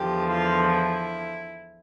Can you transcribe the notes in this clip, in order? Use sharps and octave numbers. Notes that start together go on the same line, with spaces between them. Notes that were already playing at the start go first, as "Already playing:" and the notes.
Already playing: E2 D3 F3 G4
F4
E4